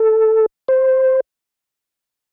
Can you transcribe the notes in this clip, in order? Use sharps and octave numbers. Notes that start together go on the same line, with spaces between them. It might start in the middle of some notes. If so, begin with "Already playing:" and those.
Already playing: A4
C5